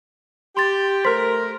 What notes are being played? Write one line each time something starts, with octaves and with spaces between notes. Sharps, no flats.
G4 C6 A6
A3 A#4 C5 C6 B6